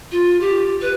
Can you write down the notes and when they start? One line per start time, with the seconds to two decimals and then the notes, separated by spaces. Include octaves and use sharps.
0.11 F4
0.40 G4
0.81 B4